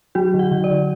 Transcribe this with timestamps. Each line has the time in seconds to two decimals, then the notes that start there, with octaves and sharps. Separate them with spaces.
0.15 F#3 F#4
0.34 D3
0.39 F#5
0.51 D3
0.64 D5
0.70 D3